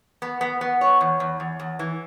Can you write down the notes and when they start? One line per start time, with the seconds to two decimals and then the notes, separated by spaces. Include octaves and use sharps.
0.22 B3
0.41 B3
0.61 B3
0.81 C#5
1.01 E2
1.20 E2
1.40 E2
1.60 E2
1.79 E3